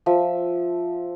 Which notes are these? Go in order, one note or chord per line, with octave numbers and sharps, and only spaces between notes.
F3 E5